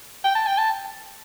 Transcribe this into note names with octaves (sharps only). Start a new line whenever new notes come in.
G5
A5
G5
A5